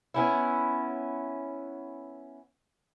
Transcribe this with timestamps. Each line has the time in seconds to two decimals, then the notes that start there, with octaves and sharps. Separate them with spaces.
0.14 B3 C#4 E4